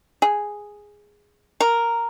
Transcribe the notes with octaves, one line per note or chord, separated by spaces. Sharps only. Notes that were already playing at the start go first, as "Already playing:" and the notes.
G#4
A#4